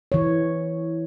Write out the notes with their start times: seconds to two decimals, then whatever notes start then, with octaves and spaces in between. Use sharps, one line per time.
0.12 E3 C#5